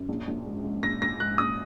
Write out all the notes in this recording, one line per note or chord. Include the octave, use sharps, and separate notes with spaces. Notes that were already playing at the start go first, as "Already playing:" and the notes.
Already playing: F#2
A#1
A#1
G#2
G#2
A#1 A#6
A#1 A#6
G#2 F#6
A#1 D#6